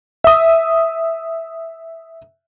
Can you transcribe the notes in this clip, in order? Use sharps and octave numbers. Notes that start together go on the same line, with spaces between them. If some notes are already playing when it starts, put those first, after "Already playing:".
E5 D#6